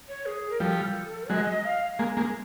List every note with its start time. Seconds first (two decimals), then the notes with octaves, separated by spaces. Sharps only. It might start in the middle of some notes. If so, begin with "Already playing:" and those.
0.09 C#5
0.26 G#4
0.50 A#4
0.60 F3 G3 A4
1.30 F#3 G#3 D#5
1.65 F5
1.99 G#3 A#3
2.17 G#3 A#3